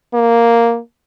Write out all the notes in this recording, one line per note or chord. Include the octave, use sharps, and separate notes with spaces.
A#3